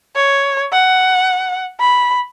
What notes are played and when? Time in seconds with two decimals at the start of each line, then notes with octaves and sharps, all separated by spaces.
0.16 C#5
0.73 F#5
1.80 B5